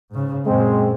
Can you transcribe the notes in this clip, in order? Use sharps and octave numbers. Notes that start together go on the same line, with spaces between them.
G#2 C#3
F#2 A#2 G#3 C4